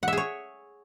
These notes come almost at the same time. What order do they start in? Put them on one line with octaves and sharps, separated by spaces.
F#5 E5 G#4 C#5